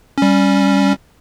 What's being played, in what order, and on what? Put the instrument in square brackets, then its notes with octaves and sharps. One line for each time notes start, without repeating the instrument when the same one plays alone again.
[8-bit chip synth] G3 C#4